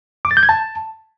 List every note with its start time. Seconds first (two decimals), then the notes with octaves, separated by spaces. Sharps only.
0.25 D6
0.31 A6
0.37 G6
0.43 G#6
0.49 A5